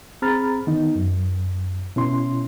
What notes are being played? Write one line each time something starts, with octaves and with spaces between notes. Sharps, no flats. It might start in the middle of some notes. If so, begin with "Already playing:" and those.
C4 G#4 A#5 B5 F6 A6
D#3 B3 D#4
F#2
B2 C#4 E4 C6